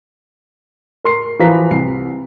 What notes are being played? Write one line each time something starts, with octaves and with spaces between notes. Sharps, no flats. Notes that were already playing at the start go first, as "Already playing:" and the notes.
A#4 C6 C7
E3 F3 B4 F5 A#5 B6
C2 C7